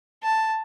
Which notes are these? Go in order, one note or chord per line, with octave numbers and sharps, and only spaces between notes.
A5